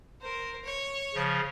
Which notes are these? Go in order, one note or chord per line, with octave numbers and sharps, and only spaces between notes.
A#4 C5
C#5
C#3 F3